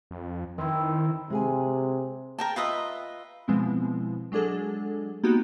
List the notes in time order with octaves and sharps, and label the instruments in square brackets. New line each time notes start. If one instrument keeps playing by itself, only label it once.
[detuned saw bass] F2
[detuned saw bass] D#3 [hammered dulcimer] C4 E4
[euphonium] C3 [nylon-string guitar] G#3 G#4 G#5
[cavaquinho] A#4 G5 A5
F4 B4 D#5 E5
[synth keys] B2 F3 G#3 B3 C4 E4
F#3 G#3 D4 G#4 A4
A#3 B3 D#4 F#4 G4